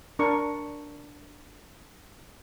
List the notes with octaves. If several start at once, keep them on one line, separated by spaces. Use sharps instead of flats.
D4 A#4 C#6